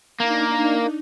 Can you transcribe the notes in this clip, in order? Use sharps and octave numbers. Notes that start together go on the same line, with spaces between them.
A#3 D4 D#4